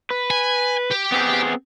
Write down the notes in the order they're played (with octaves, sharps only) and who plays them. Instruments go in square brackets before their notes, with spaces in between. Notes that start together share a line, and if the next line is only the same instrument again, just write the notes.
[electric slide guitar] B4
[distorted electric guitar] G#5
G4
[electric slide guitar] B3 C4 G#4